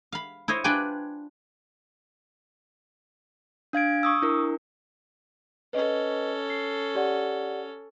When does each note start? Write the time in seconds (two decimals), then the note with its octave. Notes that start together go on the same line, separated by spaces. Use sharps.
0.12 F5 B5
0.48 E4 C5 C#5 D#5
0.64 D4 F4 B4 D5 G5 G#5
3.73 D4 F5 G#6 D7
4.03 C#6 D#6 E6
4.22 D4 E4 A#4
5.73 C#4 A4 B4 D#5
6.50 C7
6.95 G4 D5 F#5